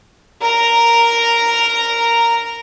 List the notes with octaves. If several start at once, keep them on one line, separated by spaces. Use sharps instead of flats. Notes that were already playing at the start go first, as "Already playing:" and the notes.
A#4 A#5